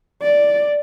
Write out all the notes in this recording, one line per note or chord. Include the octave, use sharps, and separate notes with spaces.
D5